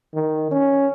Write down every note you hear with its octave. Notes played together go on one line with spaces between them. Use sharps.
D#3
C#4